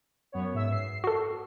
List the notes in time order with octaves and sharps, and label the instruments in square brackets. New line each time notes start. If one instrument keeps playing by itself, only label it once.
[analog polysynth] F#2 B3 C#5
G#2 E5 E6
C7
[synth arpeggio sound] F#4 A4